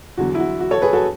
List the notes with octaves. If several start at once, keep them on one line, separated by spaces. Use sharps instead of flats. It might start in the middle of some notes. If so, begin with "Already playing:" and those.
E2 D3 F#3 F#4
E4
F#4
F#4
A4 C#5
G#4 B4
F#4 A4